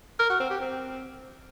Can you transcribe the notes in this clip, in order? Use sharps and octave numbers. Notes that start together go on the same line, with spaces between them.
A#4
F#4
C4
G4
C4